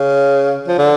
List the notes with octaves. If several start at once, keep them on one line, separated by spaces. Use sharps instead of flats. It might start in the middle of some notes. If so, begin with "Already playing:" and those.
Already playing: C#3
F3
D3